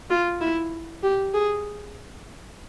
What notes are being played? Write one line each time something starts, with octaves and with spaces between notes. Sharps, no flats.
F4
E4
G4
G#4